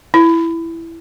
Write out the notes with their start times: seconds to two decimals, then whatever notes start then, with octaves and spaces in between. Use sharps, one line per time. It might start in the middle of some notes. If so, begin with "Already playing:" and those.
0.14 E4